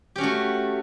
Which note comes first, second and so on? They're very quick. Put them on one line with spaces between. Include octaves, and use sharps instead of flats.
G4 C#4 F#4 A3